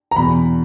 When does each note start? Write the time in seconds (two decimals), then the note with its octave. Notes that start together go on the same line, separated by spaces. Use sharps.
0.11 A#5
0.16 E2 B2 B5